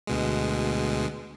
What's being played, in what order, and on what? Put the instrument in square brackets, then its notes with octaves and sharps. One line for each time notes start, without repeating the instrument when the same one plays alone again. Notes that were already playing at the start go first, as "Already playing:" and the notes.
[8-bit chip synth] D2 B2 G#3